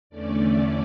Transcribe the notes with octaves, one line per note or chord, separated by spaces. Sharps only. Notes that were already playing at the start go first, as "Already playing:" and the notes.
E2 D3 A3 C#4 D5